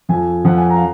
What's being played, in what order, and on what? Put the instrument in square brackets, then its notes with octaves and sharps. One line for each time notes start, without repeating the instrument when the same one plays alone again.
[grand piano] F2 F3 G#5
F2 F3 F#5
G#5
A#5
F5